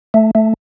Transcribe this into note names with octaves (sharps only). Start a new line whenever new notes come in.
A3
A3